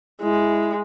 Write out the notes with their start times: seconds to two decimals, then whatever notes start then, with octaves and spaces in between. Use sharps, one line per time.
0.22 G#3 E4